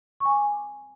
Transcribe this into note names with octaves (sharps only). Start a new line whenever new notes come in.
C#6
G#5
D6